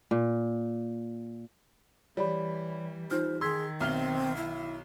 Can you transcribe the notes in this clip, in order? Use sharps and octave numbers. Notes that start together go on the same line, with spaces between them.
A#2
E3 G3 C#5 D5 B5
D#4 F4 C5 F6
D#3 G#4 C6 E6 G#6 B6
B1 C4 E5 F6 G7
E4